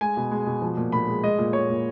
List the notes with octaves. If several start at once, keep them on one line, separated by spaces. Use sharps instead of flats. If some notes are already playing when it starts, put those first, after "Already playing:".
G#3 G#5
B2
G#3
B2
F3
A#2
A#2 B5
G#3
G#3 D#5
A#2
G#3 C#5
A#2